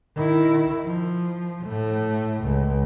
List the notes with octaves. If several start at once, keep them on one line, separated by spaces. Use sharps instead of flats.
D#3 E4
F3
A2 A3
C#2